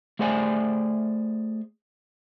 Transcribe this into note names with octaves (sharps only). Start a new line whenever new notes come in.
A3 G#4 C5 D5 G#5